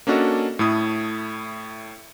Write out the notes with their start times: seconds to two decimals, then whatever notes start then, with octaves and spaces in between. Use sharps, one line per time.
0.07 A#3 C#4 D4 F#4 A4 D#5
0.59 A2 A3 E4 D#6